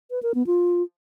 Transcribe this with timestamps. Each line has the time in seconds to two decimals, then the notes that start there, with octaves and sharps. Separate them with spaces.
0.11 B4
0.23 A#4
0.35 B3
0.47 F4